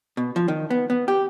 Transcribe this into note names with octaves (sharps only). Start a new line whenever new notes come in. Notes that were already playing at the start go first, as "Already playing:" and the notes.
B2
F3
D#3
B3
B3
G4